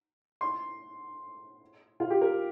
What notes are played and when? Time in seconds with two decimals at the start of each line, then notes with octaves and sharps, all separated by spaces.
0.41 C6
2.00 F4
2.10 G4
2.21 A#4